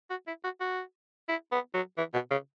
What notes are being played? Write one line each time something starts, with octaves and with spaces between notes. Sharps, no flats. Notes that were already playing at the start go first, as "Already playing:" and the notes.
F#4
E4
F#4
F#4
E4
B3
F#3
E3
B2
C#3